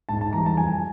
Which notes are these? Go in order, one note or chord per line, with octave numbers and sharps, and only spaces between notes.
G#2 A5
A5
E3 G3 A#5
A5
F2 G#5